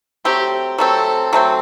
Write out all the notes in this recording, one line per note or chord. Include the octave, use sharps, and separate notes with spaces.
F#3 A3 C4 G4
F#3 A3 C4 A4
F#3 A3 C4